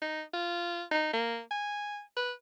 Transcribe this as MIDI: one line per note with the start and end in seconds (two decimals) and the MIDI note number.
0.02 0.22 63
0.34 0.83 65
0.92 1.11 63
1.13 1.40 58
1.51 2.00 80
2.17 2.32 71